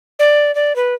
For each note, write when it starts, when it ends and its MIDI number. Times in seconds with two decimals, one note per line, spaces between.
0.19 0.54 74
0.55 0.75 74
0.76 0.94 71